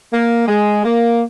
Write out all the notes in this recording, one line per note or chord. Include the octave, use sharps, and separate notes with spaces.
A#3
G#3
A#3